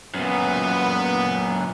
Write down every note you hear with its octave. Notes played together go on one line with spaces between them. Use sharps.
F#2 A#2 B3